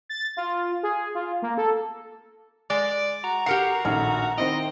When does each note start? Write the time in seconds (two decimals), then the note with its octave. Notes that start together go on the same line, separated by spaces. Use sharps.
0.09 A6
0.37 F4
0.83 G#4
1.15 F4
1.42 A#3
1.58 A4
2.70 G#3 D5
3.24 F#4 A#5
3.46 G4 A#4 F#5 C7 C#7
3.85 A#1 A2 D#3 C#4
4.38 D#3 C4 E4 D#5 G5